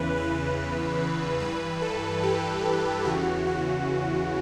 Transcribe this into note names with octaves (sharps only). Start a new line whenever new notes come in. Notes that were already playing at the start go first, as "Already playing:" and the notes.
Already playing: E2 C#3 E3 B4
B4
G2 E3 B4
A4
G4
E2 C#3 E3 F#4
F#4